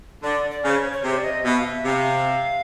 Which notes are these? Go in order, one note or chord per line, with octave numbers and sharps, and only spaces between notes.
D3 D5
D5
C#3
C5
C#5
C#5
C3 C5
D5
D#5
B2 E5
F5
E5
C3 F5